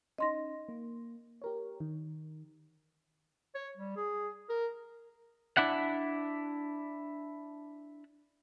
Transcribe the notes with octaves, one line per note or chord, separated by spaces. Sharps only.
C#4 D#4 D#5 C6 A#6
A#3
G4 A#4 C#5
D#3
C#5
G3
G#4
A#4
D4 E4 F#5